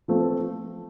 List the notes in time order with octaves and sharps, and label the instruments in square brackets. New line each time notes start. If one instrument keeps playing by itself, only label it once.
[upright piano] F3 A3 C4